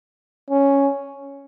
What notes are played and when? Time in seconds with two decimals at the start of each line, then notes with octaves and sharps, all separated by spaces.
0.50 C#4